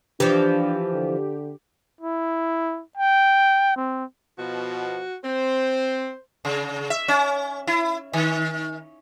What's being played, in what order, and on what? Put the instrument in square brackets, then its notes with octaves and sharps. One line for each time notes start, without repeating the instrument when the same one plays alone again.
[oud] E3 F3 [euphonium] D4 [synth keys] G4
[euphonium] D3
[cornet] E4
G5
C4
[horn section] B2 F3 [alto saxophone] F#4
[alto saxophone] C4 [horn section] C5
[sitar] C#3
E5
C#4
E4
D#3